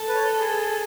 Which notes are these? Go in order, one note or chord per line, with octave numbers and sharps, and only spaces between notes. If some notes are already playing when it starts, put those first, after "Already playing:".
Already playing: A4
B4
C#5
B4
G#4